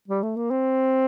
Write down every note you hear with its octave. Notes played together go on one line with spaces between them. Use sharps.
G3
A3
A#3
C4